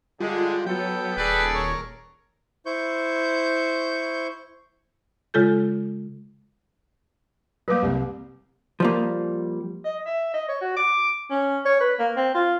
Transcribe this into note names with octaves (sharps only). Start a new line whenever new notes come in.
D3 G3 G#3 F4 G#4
F#3 B3 A4 G5
D#1 G#4 A4 B4 D5
A#4 C#5
E4 C5 C#6 G6
C#3 G#3 F4 A4 G6
F#3 G3 A#3 B4 D6
C2
F3 G3 A#3
D#5
E5
D#5
C#5
F#4
D6
C#4
C#5
B4
A#3
C4
F4